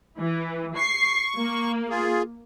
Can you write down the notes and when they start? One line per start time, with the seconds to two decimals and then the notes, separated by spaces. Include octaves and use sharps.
0.19 E3
0.76 C#6 C7
1.38 A#3
1.89 F4 G#4